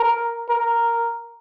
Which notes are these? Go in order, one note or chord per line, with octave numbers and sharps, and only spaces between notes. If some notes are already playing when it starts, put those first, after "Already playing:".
Already playing: A#4
A#4